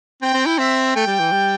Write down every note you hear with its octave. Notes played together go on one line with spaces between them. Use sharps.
C4 G5
C4
E4
C4 E5
A3 G5
G3
E3
G3